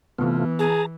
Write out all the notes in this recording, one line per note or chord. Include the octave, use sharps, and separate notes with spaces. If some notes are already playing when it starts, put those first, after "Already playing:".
C3 E3 A3 B3 F4
G#4 A5 A#5